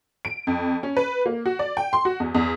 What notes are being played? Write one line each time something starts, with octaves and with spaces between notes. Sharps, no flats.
D7
F2
C#4
B4
A#3
F#4
D5
G5
C6
F#4
E2
E2